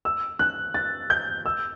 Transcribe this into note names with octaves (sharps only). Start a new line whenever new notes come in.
E6
F#6
A6
G6
E6